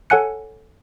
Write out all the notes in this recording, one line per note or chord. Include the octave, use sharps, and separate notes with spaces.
A4 C#5 F#5 G#5 F#6 C#7